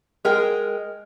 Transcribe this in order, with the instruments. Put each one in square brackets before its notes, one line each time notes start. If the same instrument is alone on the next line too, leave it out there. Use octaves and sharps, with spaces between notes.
[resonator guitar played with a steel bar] G#3 A#4 G5